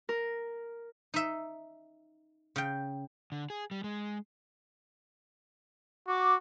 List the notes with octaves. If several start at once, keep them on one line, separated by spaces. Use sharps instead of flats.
A#4
D#4 E5
C#3 G5
D3
G#4
G3
G#3
F#4 D6